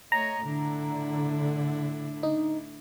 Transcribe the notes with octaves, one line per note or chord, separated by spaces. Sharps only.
A3 C#5 D#5 A#5
A2 D3 D4 E4
D#4